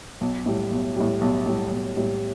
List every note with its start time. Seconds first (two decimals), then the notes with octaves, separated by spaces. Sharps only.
0.21 B1
0.46 A2 G3
0.71 B1
0.96 A2 G3
1.21 B1
1.46 A2 G3
1.71 B1
1.97 A2 G3